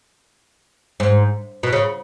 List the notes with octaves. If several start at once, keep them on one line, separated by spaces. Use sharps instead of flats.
G#2
B2
C#3